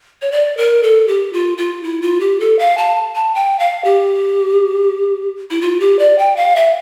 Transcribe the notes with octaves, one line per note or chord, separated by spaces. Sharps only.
C#5
D5
A#4
A4
G4
F4
F4
E4
F4
G4
A4
F5
A5
A5
G5
F5
G4
E4
F4
G4
D5
G5
F5
E5